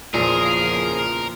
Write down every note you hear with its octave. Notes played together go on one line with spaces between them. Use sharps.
E2 A#2 C#3 F3 G#4 A#4